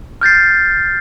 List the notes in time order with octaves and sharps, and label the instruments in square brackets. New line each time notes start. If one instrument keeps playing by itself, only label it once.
[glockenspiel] F6 G6 A6 C7